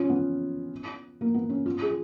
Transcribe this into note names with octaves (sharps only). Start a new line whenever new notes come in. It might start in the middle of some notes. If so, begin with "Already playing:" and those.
Already playing: C#4 F4
B3
A#3
B3
C#4
F4
G#4